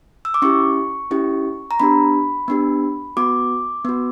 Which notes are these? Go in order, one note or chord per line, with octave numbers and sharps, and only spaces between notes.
E6
D6
C#4 E4 G4 C#6
C#4 E4 G4
A#5
B3 D4 G4 B5
B3 D4 G4
B3 F#4 D6
B3 F#4